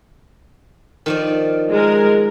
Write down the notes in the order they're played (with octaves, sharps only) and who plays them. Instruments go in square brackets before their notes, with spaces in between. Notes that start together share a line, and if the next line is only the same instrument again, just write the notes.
[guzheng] D#3 F3 D5
[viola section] G#3 A#4